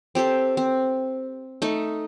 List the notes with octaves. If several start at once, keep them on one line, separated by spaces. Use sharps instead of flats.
C4 G4 A4 C5
C4
A3 D#4